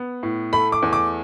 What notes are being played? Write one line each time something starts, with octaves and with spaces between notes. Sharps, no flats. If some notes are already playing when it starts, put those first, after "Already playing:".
Already playing: B3
A2
A3 B5
D6
E2
D6